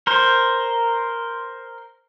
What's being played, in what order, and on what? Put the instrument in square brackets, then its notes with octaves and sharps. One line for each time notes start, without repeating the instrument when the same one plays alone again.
[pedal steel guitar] A#4 C5